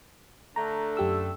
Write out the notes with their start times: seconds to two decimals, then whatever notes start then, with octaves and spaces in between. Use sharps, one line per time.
0.56 D3 A3 A#5
0.97 F#2 G4 E6